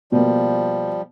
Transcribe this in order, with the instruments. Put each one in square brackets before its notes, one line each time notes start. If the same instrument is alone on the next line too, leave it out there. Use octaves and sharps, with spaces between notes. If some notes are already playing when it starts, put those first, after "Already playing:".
[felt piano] B2 A#3 [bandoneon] F3 G3